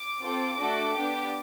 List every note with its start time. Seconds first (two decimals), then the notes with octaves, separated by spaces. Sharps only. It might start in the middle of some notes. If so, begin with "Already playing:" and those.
Already playing: D6
0.22 C4 F4 A4
0.59 A3 D4 F#4 A4
0.95 B3 D4 G4